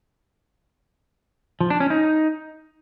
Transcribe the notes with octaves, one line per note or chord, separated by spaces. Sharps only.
F3
D4
C#4
D#4